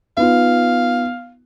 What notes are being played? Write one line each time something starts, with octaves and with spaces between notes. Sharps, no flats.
B3 D#4 F4 F5